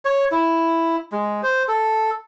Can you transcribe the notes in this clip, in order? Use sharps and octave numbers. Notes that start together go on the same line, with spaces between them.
C#5
E4
G#3
C5
A4